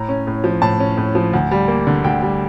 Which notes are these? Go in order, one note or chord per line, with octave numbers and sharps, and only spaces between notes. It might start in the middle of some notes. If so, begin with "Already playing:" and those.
Already playing: A2 A#5
C#4
A2
F3
A2 A5
C#4
A2
F3
D2
G3
A#3
D3
D2 G5
G3